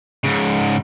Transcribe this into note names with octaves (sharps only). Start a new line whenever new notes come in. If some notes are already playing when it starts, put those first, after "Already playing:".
G#2 C#3